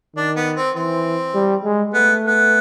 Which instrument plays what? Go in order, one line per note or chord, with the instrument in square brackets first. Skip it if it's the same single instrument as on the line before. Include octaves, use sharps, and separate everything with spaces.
[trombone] D#3 [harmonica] D4
[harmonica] B3
C4
[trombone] E3 [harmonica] C4
[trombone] G3
G#3
[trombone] A3 [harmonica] B3
[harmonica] B3